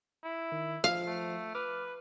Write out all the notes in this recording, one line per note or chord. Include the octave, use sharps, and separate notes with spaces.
E4
D#3
F3 F5
A3
B4 D6 F6